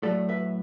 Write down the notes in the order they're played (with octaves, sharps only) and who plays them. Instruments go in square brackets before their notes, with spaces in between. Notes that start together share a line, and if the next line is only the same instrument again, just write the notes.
[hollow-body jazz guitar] A2 F#3 A3 A4 D5
B4 E5